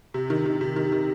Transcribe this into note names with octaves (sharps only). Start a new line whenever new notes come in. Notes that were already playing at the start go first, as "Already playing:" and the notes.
C3
D#3
D#3
C3
D#3
D#3